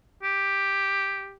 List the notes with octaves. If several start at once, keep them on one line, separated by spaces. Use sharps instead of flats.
G4